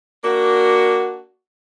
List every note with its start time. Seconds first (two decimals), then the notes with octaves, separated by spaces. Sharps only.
0.23 A#3 D4 F#4